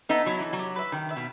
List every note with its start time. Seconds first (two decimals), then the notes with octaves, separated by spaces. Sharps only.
0.09 B3 D#4 A4 E5
0.26 F#3 E4
0.40 E3 A4 E5
0.53 F#3
0.59 G4
0.76 B4 E5
0.92 D#3 G4
1.09 B4 E5
1.16 B2